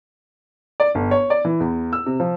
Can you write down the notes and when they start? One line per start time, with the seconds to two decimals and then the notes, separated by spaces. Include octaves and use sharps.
0.80 D5
0.95 G1
1.11 C#5
1.30 D5
1.45 E3
1.60 E2
1.93 E6
2.06 C3
2.20 F3